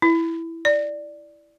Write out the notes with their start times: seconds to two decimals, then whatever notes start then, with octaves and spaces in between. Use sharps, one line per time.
0.02 E4
0.65 D5